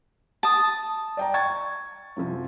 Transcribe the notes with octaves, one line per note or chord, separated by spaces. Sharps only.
A5 D#6
D5 G5 A#5
C#6 G#6 A6
F#2 C3 F3